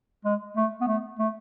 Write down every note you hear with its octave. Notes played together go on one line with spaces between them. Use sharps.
G#3
A3
B3
A3
A3